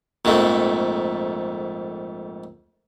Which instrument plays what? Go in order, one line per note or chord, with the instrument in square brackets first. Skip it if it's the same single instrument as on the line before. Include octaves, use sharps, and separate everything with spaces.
[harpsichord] A#1 F2 G#2 A3